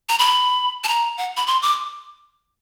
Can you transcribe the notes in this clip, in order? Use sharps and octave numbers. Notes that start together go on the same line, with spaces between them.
A#5
B5
A5
A#5
F#5
B5
C6
D6